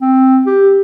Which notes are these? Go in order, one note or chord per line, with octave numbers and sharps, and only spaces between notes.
C4
G4